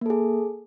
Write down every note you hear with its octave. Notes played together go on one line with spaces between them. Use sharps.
A#3 G#4 A4